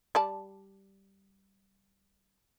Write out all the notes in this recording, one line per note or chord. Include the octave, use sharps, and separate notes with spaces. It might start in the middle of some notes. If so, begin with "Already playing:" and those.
G3 D5 A5